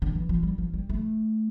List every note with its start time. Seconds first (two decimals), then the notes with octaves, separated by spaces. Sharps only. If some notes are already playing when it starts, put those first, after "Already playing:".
0.02 D3
0.15 E3
0.29 F3
0.43 G3
0.58 F3
0.74 G3
0.89 A3